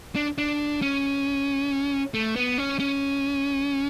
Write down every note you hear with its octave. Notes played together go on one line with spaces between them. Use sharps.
D4
D4
C#4
A3
B3
C#4
C#4